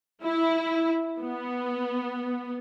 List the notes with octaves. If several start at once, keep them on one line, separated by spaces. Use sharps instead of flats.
E4
B3